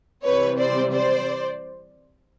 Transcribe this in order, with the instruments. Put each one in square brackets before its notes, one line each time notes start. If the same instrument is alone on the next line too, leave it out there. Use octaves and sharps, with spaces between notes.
[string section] C3 E3 G3 C4 B4 C#5
C5 D5
C5 D5